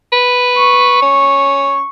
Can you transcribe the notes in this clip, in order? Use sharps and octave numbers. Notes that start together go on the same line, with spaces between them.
B4
C#6
C#4